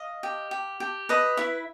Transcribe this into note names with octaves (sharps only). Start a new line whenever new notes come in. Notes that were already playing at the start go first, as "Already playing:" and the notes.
Already playing: D#5 F5
G4
G4
G4
B4 D#5
E4 E5